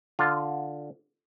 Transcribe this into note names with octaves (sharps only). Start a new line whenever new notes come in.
D3 F4